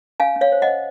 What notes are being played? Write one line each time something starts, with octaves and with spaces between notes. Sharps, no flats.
C#4 F5 G#5
C#4
C#5 F5
C5
D#5 F#5
C5